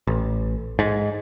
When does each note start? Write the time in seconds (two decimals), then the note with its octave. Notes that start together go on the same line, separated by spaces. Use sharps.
0.07 A1
0.79 G#2